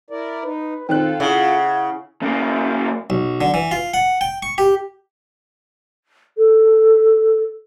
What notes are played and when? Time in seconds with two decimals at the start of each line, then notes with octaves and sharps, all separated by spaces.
0.10 E4 A#4 D5
0.44 D#4 B4
0.89 D#3 C4 F4 A4 G5 F#6
1.20 C#3 E4 F#5
2.22 C#3 A#3
3.10 B1
3.41 D3
3.54 E3
3.71 F4
3.94 F#5
4.21 G5
4.42 C#6
4.58 G4
6.38 A4